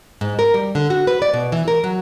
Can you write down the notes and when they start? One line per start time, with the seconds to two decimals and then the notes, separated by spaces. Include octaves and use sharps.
0.21 G#2
0.39 A#4
0.54 G3
0.75 D3
0.90 F#4
1.07 B4
1.22 D5
1.33 B2
1.52 E3
1.68 A#4
1.84 F#3